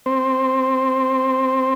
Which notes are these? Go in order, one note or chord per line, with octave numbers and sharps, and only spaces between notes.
C4 C5